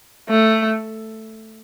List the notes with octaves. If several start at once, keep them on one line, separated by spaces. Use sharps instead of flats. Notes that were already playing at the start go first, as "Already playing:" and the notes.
A3